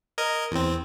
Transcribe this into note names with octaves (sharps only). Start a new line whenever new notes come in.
A#4 D#5 G#6
E2 C4